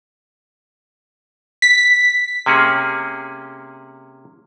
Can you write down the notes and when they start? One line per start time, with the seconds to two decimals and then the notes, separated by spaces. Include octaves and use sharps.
1.62 B6
2.46 C3 A#3 C#4 G#4